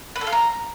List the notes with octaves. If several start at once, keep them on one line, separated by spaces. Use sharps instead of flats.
B4
A4
F5
A#5